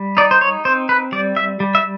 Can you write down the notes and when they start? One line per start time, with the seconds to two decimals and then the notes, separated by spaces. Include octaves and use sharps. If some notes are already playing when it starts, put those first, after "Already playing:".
Already playing: G3
0.17 D#4 D5
0.31 C5
0.41 C#5
0.65 C4 C5
0.89 B4
1.12 G3 D5
1.37 E5
1.60 G3
1.75 E5